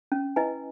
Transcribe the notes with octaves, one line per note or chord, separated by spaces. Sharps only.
C#4
E4 B4 D#5 G#5